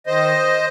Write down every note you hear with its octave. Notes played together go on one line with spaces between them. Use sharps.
D#3 C5 D#5